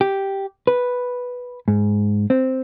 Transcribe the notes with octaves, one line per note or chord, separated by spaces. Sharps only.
G4
B4
G#2
C4